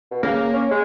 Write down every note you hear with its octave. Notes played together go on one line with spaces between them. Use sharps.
B2
C#3 A#3
C#4
G#3